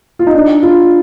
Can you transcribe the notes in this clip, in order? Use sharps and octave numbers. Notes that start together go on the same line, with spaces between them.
F4
D#4
D4
F4